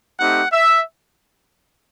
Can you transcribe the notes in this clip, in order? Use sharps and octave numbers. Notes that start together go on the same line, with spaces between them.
A3 C4 D#4 G4 F#5
E5